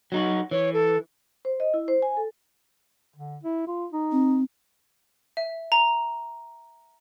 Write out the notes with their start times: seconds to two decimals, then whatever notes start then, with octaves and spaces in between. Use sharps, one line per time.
0.12 F#3 D#4 F#4
0.51 E3 C#5
0.73 A4
1.45 C5
1.60 D#5
1.74 E4
1.88 C5
2.02 G#5
2.17 A4
3.16 D3
3.43 E4
3.67 F4
3.93 D#4
4.12 C4
5.37 E5
5.72 A#5